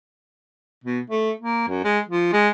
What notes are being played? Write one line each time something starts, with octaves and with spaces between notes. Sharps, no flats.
B2
A3
A#3
F#2
G#3
F3
G#3